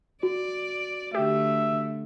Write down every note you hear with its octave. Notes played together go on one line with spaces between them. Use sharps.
F#4 D5
D3 A3 G4 E5